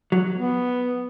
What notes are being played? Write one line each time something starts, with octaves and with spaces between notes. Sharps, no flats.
F#3
B3